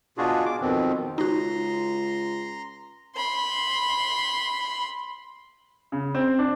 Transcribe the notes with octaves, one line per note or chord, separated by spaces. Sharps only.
B2 D4 F4 F#4 G#4
D6
F2 B2 D#3 C4
C#2 D#4 F#4 A#5 C6
B5 C6
C#3
C4
D4